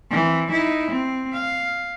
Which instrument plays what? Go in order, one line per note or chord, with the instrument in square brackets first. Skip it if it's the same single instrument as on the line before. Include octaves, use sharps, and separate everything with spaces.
[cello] E3 C4
D#4 E4
C4
F5